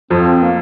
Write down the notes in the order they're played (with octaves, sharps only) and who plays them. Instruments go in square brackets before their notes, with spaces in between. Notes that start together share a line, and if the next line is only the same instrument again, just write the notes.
[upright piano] F2 F3 [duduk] C4
[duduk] A#3